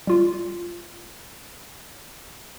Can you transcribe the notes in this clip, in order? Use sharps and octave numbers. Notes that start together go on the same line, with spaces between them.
G3 F4